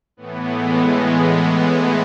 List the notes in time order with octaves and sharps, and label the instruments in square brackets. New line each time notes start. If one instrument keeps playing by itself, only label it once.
[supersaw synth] A2 E3 B3
G#3